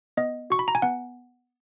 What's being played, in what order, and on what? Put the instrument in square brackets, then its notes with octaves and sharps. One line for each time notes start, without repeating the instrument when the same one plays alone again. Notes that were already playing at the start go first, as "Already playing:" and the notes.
[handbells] B3 D#5
F#4 C#6
B5
A#5
G#5
B3 F#5